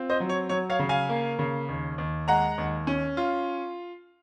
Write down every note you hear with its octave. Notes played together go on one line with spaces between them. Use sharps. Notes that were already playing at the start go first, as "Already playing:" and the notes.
Already playing: C4 F4
C5 D#5
F#3
C#5
F#3 C#5
C#5 F5
C#3
F5 G#5
A#3
C#3
D#2
D#2
G#3 F#5 A#5
D#2
C#4
F4